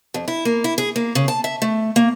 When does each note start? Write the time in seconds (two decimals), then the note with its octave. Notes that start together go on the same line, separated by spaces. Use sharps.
0.14 F2
0.28 E4
0.45 A#3
0.64 E4
0.78 G#4
0.96 A#3
1.15 C#3
1.28 A5
1.44 E5
1.62 A3
1.96 A#3